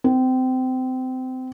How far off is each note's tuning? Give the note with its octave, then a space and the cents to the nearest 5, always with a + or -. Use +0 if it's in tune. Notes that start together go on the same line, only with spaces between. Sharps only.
C4 -25